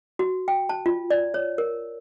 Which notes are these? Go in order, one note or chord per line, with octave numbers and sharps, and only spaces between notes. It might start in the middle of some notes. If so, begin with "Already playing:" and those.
F#4
G5
A5
F4
D5
C#5
A#4